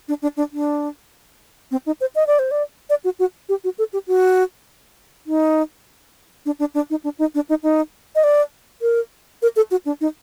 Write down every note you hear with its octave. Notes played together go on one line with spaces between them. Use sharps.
D4
D4
D4
D4
C4
D#4
C5
D#5
D5
C5
D5
D5
F#4
F#4
G4
F#4
A4
G4
F#4
D#4
D4
D4
D4
D#4
D4
D#4
D4
D#4
D#4
D#5
D5
A#4
A#4
A4
F#4
D4
D#4